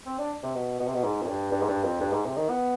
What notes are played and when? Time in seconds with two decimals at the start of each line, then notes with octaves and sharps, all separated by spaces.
0.06 C4
0.18 D4
0.43 C3
0.55 B2
0.80 B2
0.87 C3
0.94 B2
1.03 G#2
1.22 F2
1.28 G2
1.52 G2
1.62 G#2
1.68 G2
1.84 F2
2.01 G2
2.13 G#2
2.25 C3
2.37 D#3
2.49 B3